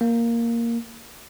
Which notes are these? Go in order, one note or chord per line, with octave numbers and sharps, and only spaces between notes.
A#3